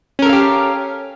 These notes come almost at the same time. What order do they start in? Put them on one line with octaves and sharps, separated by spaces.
C#4 A#4 A4 F5 G4